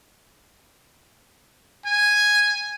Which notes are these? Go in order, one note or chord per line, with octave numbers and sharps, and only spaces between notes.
G#5